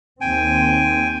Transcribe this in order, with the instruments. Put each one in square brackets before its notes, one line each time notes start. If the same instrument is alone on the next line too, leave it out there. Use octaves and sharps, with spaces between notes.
[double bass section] D#2 C4 [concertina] G5 G#5